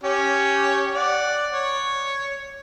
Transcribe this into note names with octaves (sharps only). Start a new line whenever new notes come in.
C#4 G4 C#5
D5 F#5
C#5